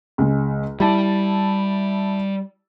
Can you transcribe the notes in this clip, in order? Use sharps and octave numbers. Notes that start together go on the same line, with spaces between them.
C#2 G#3
G3 E4 A5